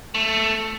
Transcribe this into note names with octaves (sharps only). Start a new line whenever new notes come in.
A3